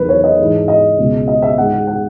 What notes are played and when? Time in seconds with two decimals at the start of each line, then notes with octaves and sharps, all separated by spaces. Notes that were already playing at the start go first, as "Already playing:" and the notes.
Already playing: E2 D#3 F#3 A#4 B4
0.09 C#5
0.24 D#5
0.39 G#2 E3 G#3
0.68 D#5
0.98 C#2 B2 G#3
1.28 D#5
1.42 E5
1.57 G#2 D#3 G#3 F#5
1.72 F#5
1.87 F#5